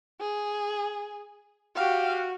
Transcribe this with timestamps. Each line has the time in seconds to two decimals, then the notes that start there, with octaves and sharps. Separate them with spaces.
0.21 G#4
1.76 F#4 G4 F5